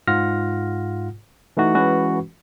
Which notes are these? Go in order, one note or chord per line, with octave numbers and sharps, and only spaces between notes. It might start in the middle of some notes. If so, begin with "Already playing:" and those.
G#2 F4 F#5 F6 A#6
E3 A3 D#4 F#4
E3 G#3 C#4 F#4 B4